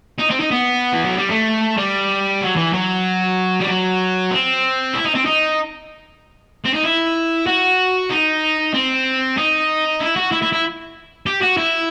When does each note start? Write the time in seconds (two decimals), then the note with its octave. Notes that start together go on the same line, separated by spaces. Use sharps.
0.19 D#4
0.31 C4
0.40 D#4
0.51 B3
0.93 E3
1.04 F#3
1.15 G3
1.30 A3
1.77 G3
2.42 F#3
2.56 E3
2.73 F#3
3.60 G3
3.67 F#3
4.31 C4
4.94 E4
5.04 D#4
5.15 C4
5.25 D#4
6.65 C4
6.74 D#4
6.83 E4
7.46 F#4
8.11 D#4
8.74 C4
9.37 D#4
10.00 E4
10.16 F#4
10.32 E4
10.42 E4
10.53 E4
11.26 G4
11.42 F#4
11.57 E4